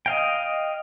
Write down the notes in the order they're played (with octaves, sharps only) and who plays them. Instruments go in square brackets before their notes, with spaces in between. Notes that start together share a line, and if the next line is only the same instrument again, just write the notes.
[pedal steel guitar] D#5 F5 G5